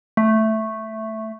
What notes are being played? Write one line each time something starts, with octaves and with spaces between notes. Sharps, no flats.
A3